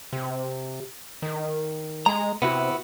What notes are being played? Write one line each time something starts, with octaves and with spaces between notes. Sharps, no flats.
C3
D#3
G#3 A#5
C3 B3 E4 F#4